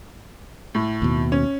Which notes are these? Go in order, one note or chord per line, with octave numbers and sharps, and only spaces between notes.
A2
D#2 B2
C#4